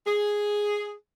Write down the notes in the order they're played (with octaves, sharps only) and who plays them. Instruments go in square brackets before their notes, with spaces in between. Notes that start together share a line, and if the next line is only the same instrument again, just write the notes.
[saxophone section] G#4